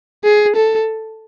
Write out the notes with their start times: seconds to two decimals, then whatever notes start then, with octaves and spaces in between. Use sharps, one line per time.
0.24 G#4
0.56 A4